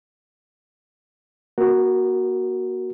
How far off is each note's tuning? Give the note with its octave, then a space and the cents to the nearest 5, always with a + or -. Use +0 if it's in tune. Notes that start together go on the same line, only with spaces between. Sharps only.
A#3 +40 F#4 +5 A#4 +0